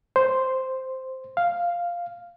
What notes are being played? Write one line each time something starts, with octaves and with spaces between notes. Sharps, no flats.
C5
F5